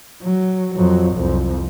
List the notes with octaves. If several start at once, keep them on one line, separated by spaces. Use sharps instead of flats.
F#3
F2 F#3
C2 F2